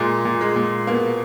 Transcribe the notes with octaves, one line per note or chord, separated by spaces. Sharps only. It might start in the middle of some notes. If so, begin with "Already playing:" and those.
Already playing: A#2 G#3
A#2
G#3
A#2
B2 A#3